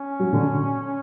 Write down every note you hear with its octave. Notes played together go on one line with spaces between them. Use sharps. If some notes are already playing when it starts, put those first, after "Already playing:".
Already playing: C#4
F#3
D3